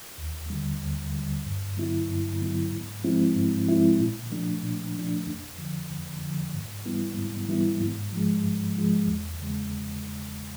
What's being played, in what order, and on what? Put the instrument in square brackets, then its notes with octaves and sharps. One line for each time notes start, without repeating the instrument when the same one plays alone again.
[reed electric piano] D#2
D3 G3
D#2
D3 G3
G2
D3 F#3 B3 E4
G2
D3 F#3 B3 E4
G#2
F3 G#3 C4 E4
G#2
F3 G#3 C4 E4
A#2
F3 A3 D4
A#2
F3 A3 D4
F2
D3 F3
F2
D3 F3
G#2
E3 G3 B3 E4
G#2
E3 G3 B3 E4
G#2
F3 G#3
G#2
F3 G#3
E2
C#3 E3 G#3